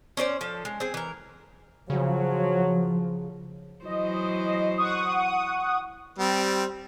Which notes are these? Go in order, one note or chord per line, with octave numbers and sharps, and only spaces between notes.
C#4 D4 C5 D5
F3 A4
G#3
C4 G#4
E3 A#4
C#3 F3 F#3
E3 F#3 C5 D#5
F#5 C#6 D#6
G3 C4